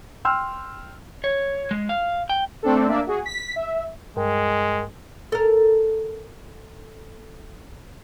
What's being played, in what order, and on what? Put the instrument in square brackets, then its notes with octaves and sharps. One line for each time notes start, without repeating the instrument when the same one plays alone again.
[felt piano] G5 C6 E6 F6
[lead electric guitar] C#5
G#3
F5
G5
[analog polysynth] A3 C4 D4 A4
A#3 D4 D5 E5
F#4 G#4
B6
E5
[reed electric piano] G2 A#4 G5 [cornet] G#3
[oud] A4 A#4